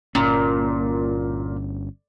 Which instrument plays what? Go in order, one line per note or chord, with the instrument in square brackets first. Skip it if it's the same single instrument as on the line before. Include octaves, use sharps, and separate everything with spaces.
[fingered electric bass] G1 C#4 [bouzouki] A#2